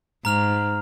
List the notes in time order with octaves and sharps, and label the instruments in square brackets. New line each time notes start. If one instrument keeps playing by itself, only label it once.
[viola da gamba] G#2 [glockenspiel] A#5 F6 F7